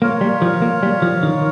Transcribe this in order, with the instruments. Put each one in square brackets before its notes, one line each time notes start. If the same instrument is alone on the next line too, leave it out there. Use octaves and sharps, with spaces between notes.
[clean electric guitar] A#3 [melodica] F4 A#4 C#5
[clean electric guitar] G3
F3
A#3
G3
F3
D#3